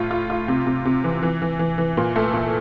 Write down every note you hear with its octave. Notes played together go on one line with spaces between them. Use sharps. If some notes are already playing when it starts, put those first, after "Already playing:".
Already playing: A2 F4
F4
F4
C3
C3
C3
E3
E3
E3
E3
E3
A#2
A3
A#2